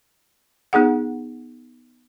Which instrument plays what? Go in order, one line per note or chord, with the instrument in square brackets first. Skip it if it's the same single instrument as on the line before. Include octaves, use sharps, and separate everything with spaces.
[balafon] B3 D#4 G#4 F#5